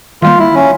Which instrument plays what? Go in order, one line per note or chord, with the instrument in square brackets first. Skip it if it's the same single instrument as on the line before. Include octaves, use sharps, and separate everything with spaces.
[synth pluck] D#3 G3 A#3 [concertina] F4
[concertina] E4
C#4